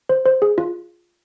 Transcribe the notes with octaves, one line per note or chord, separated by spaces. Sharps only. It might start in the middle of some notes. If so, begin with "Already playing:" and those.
C5
C5
G#4
F4